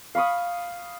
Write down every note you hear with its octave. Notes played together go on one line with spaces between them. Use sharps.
F5 B5 C#6 D#6